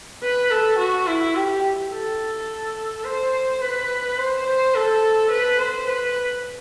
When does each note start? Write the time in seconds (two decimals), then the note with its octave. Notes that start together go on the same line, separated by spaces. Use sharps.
0.23 B4
0.51 A4
0.79 F#4
1.07 E4
1.35 G4
1.92 A4
3.05 C5
3.61 B4
4.18 C5
4.46 C5
4.75 A4
5.31 B4
5.59 C5
5.87 B4